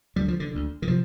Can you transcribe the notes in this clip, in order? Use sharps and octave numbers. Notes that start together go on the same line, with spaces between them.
D2 D3 G3
F3
D3
D2 D3
D#3
C3 F3